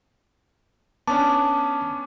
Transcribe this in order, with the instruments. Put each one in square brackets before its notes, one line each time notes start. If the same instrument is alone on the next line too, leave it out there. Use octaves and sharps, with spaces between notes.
[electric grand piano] B3 C#4 D4 [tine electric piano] A5 [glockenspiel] D6